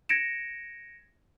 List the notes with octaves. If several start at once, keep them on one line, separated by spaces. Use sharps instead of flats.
G#6 A#6 C#7 D7 E7